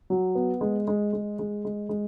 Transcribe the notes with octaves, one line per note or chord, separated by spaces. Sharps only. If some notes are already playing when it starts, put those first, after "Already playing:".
F#3
B3
G#3
G#3
G#3
G#3
G#3
G#3